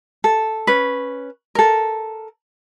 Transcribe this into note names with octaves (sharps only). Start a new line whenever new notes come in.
A4
C#4 B4
A4 A#4